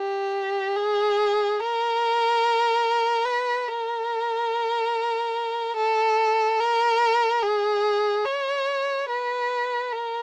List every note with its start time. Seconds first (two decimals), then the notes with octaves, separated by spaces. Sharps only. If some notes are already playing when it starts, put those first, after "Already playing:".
Already playing: G4
0.76 G#4
1.59 A#4
3.25 B4
3.68 A#4
5.76 A4
6.59 A#4
7.42 G#4
8.25 C#5
9.09 B4
9.92 A#4